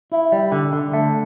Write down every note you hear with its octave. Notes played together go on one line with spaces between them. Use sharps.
E4
G3
D3
D3
A3